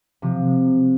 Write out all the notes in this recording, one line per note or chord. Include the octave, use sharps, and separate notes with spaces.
C3 F3